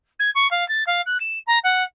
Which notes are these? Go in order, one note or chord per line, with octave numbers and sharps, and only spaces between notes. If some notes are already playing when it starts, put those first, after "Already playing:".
G#6
C#6
F5
A6
F5
F#6
E7
A#5
F#5